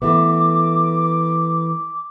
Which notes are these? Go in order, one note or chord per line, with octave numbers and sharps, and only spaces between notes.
E3 A3 B3 D6